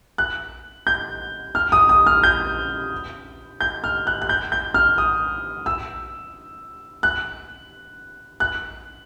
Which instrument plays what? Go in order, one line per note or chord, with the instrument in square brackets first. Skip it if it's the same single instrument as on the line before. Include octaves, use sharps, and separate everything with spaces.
[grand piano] F#6
G6
F6
D#6
D#6
F6
G6
G6
F6
F#6
F#6
G6
G6
F6
D#6
E6
F#6
F#6